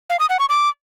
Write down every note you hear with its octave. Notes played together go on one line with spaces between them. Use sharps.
F5
D#6
F#5
C#6
D6